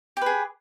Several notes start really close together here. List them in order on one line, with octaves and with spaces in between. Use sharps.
G4 B4 G#4